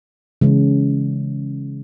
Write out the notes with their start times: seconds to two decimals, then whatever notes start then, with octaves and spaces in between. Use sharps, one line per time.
0.41 C#3 E3 G#3 C#4